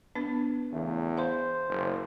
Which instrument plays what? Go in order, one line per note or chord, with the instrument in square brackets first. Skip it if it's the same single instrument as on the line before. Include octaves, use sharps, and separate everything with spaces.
[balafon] B3 D4 B4
[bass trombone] E2 [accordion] C#3 A3
[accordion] C5 [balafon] F5 C6
[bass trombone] F#1